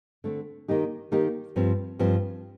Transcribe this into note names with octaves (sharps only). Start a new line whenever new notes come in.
D3 A3 C4
D#3 A#3 D#4 G4
D#3 A#3 D#4 G4
G2 F3 C4
G2 F3 C4